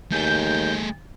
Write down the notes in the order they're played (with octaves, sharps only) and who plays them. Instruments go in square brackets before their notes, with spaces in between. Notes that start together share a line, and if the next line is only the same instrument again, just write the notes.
[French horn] D#2 [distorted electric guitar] A3 G#4 [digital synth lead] G6